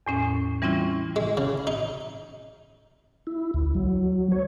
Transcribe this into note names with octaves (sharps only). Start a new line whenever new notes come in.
E2 A2 C#4
E3 G3 C4 C#4 E4 F4
G#3
C#3
D#4
E4
D2
F#3
C#5